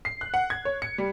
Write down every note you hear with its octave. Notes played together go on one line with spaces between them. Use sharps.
C7
F#6
F#5
G#6
C#5
C#7
G3